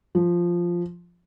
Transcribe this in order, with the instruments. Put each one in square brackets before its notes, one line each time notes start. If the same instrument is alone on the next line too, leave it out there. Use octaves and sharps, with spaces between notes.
[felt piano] F3